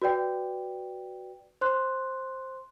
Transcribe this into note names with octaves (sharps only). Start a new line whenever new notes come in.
F#4 B4 D5 G5
C5 C6 F#6